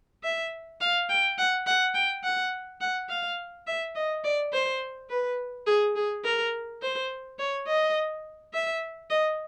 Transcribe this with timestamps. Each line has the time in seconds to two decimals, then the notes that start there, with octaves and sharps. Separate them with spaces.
0.23 E5
0.81 F5
1.10 G5
1.38 F#5
1.67 F#5
1.95 G5
2.23 F#5
2.81 F#5
3.09 F5
3.67 E5
3.95 D#5
4.24 D5
4.53 C5
5.10 B4
5.66 G#4
5.96 G#4
6.24 A#4
6.82 C5
7.39 C#5
7.67 D#5
8.53 E5
9.10 D#5